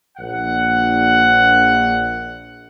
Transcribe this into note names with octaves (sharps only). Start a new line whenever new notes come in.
A#1 F#5